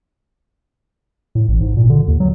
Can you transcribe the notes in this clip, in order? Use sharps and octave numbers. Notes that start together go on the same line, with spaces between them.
A2
A1
G#2
A#2
D3
D#2
F#3